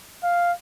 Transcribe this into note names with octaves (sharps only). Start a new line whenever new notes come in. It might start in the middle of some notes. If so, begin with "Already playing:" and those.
F5